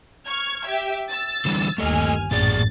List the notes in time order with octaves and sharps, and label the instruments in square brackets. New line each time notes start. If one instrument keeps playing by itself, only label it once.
[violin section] C#6 F6 G#6
G4 E5
E6 A6
[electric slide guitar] D3 E3 G3
[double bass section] G1 D#2 [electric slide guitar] A3 A4 D#5 [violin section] G#5 F6
[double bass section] A1 F#2 [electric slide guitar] A#2 G#4 D5 [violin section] A6